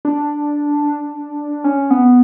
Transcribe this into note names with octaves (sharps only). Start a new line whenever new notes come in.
D4
C#4
B3